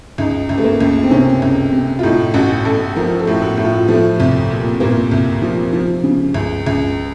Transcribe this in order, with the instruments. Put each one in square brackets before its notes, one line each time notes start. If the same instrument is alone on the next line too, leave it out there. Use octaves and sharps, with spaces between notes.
[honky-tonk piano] C#2 D#4
C#2
A3
A#3
C#2
C4
C3 C#4
C#2
C3
F4
A2 D#4
A1 F#4
A1 A4
F3 A#4
A4
A2
F#4
A2
F4
F3 A3
C2
A#2
A#2 A#3
C2
F3
F3
C#3
C#2
C#2